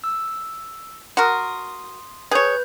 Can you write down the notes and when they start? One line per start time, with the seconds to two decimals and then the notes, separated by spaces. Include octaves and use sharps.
0.04 E6
1.17 F#4 A#4 C6 D#6
2.31 G#4 B4 C#5 G6